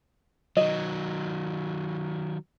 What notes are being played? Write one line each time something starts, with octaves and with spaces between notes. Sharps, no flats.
D#3 F#3 D#5